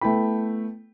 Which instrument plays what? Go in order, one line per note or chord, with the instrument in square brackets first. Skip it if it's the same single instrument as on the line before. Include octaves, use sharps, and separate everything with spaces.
[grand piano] A3 B3 E4 G5 B5